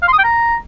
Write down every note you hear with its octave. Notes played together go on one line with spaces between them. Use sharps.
F5
C6
D#6
G5
A#5